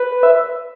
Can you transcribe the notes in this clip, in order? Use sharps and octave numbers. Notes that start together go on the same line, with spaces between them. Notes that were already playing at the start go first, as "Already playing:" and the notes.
Already playing: B4
E5